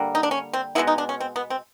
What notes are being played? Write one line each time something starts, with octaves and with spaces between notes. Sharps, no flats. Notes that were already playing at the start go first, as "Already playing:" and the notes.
Already playing: D3 G3 A#3
D#4
D4
C#4
C4
B2 G#3 B3 E4
D#4
D4
C#4
C4
B3
C4